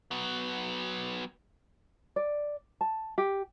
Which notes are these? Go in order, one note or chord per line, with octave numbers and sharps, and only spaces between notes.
F#3 B3
D5
A5
G4